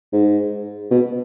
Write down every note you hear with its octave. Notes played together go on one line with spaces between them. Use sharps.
G#2
B2